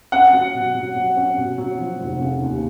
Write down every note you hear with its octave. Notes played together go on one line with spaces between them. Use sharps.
C#4 F#5
F#3
B2
F#3
F#3
C#4
B2
F#3
F3
F1
C#3
D#2